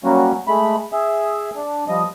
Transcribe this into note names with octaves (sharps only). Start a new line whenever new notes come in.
F#3 G3 A#3 C#4 F#4
G#3 A3 B5
G#4 E5
D4
F3 G3 D#5